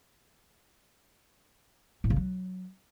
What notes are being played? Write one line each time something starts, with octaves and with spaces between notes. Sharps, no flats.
A2
C#3
F#3